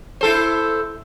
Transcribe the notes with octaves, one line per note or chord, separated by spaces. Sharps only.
E4 A4 C5